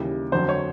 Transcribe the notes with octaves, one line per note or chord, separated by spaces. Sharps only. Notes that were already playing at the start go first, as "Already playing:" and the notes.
Already playing: D#2 C#3 E3 G3
F1 F2 D3 F#3 C5
C#5